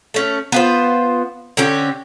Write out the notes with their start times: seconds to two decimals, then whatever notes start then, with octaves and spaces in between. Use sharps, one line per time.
0.14 A3 C#4
0.52 B3 F4 C5
1.57 D3 C4 C#4 G4